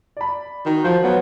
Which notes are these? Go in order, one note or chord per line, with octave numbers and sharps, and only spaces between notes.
D5 B5
D#3 F#4
F3 G6
F#3 B3